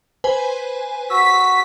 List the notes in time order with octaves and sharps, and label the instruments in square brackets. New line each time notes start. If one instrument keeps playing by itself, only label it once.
[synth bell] B4 C5 G#5
[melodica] F#4 [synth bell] E6 [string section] B6